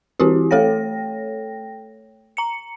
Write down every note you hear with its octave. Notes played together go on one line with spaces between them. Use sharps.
E3 C4 E4 F#4 G4
A3 A4 C#5 G5 A#6
A#5 C#7